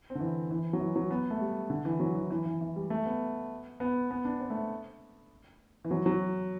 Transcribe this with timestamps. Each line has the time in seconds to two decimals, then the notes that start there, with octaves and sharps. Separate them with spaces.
0.10 C4
0.15 D3
0.20 E3
0.51 E3
0.73 F#3
0.80 E3
0.96 F#3
1.11 B3
1.30 A3
1.41 G3
1.70 D3
1.85 E3
2.00 F#3
2.16 E3
2.30 E3
2.45 E3
2.61 E3
2.76 G3
2.90 A3
3.06 B3
3.80 B3
4.11 B3
4.25 D4
4.40 C4
4.50 A3
5.85 E3
5.91 F#3
6.06 F#3